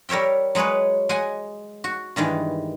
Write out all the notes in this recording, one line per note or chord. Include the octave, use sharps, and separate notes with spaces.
G3 A#4 C#5 E5 G5
F#3 G#3 G#4 B4 C#5
G#3 F#5 G#5
F#4
G2 D#3 E3 G#3